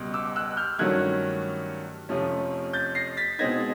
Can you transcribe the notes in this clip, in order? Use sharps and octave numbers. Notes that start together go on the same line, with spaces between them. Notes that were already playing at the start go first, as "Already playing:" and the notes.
Already playing: C#2 B2 G3
D6 E6
E6 F#6
F6 G6
G2 D#3 F#3 A3 C#4 F#6 G#6
F2 C3 F3 A3 C#4
G6 A6
A#6 C7
A6 B6
B2 G#3 C4 D#4 G#6 A#6